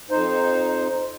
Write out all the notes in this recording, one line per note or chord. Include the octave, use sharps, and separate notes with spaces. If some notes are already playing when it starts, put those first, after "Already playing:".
F2 D#4 C5